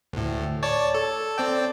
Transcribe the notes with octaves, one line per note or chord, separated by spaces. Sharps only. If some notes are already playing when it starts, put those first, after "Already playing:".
D2 A2
C#5 D5 A5
A4
C4 D5 G5